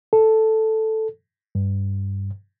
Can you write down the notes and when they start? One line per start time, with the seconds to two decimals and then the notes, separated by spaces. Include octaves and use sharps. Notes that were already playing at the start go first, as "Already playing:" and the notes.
0.13 A4
1.55 G2